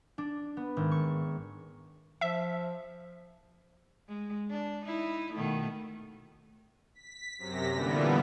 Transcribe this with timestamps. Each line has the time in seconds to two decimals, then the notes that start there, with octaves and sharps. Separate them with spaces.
0.18 D4
0.57 B3
0.77 G#1
0.91 C#6
2.21 F3 E5
4.09 G#3
4.50 D4
4.85 D#4 E4
5.33 B2 D#3 A3
6.94 B6
7.39 F#2 C3 A#6 B6
7.72 A#2 D3 E3 G3 B3